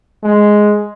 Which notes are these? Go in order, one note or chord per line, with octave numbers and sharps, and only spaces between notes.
G#3